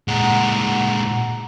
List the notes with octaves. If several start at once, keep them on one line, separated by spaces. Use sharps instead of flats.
A#2 G#3 F#5 A#5